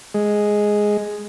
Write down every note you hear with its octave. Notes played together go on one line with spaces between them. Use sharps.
G#3